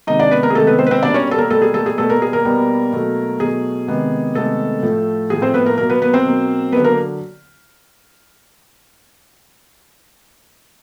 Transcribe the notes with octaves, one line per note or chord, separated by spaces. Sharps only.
C3 D#3 G#3 D#4 D#5
D4 D5
B3 B4
A#3 A#4
G#4
C3 D#3 G#3 A3 A4
B3 B4
C4 C5
B4
C4 C5
B2 G3 A#3 D4 D5
C#4 C#5
A4
A#3 A#4
B2 G3 A3 A#3 A4
G#4
A3 A4
G#4
B2 G3 A3 B3 A4
A#3 A#4
G#4
A#3 A#4
B2 G3 B3
B2 F#3 A3
B2 F#3 A3 G#4
C3 D#3 G#3 B3
C3 D#3 G#3 A3 B3 A4
A2 F3 A3
A2 F3 A3 G#4
C4 C5
B3 B4
A#3 A#4
B2 F#3 A#3 A#4
B3 B4
B3 B4
C4 C5
B2 F#3 A#3
D3 F#3 B3 B4
A#3 A#4